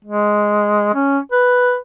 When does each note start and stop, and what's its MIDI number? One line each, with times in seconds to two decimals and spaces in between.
0.04 0.90 56
0.94 1.19 61
1.32 1.76 71